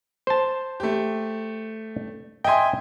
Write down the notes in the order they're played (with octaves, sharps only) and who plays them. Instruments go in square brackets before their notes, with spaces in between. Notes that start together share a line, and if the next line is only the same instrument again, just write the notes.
[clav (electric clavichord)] C5 A5
[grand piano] A3 G4
[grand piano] D#5 E5 C6 [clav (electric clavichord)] G5 G#5